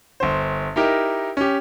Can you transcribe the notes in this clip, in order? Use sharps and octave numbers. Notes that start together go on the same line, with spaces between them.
G1 C5
D#4 E4 G4 A#4
C#4 G4